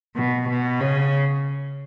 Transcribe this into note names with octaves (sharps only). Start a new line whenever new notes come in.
B2
B2
C#3